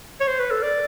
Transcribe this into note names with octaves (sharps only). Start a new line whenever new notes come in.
C#5
C5
B4
A4
D5